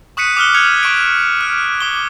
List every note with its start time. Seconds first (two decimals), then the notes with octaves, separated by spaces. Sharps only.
0.17 C#6 D#6 F#6 B6 C#7 D#7
0.36 D6 D#6 F6 F#6 G7
0.54 F6 G#6 C#7 F7
0.83 C#6 D7
1.41 F6
1.80 D6 G7